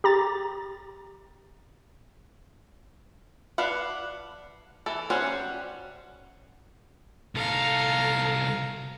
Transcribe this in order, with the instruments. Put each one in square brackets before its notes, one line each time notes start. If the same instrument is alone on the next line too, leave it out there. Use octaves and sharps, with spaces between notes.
[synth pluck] G4 A#5 A6
[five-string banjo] D4 B4 F5 F#5
E3 A4
F#3 G3 C#4 C5 F#5
[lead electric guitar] C2 A4 [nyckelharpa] F5 A#5